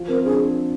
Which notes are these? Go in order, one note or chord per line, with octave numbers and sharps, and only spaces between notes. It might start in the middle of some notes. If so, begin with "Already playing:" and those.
Already playing: F3
C4 A#4
D4 G#4